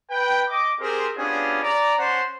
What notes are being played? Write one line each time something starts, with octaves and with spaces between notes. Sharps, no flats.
B4 G5
D#5 D6
C4 G4 G#4 A#4 C5
B3 C#4 D4 F4 G4 G#4
D5 A#5
C#4 C5 F#5 A5 C6